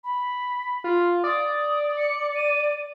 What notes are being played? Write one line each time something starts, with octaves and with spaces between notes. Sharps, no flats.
B5
F4
D5 D#6
C#7
D#7